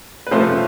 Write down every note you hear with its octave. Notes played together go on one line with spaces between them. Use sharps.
B4
C3 F3 A3 C#4 C5